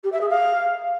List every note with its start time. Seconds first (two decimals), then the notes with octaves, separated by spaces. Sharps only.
0.03 G4
0.12 E5
0.21 G#4
0.29 F5